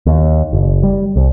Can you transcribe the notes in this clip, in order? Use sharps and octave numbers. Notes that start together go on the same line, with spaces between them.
D#2
F#1
G3
C2